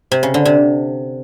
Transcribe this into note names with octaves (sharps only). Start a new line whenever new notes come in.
C3
C#3
D3
C3